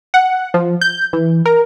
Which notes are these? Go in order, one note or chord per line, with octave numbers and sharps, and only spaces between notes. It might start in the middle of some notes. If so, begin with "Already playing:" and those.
F#5
F3
G6
E3
A#4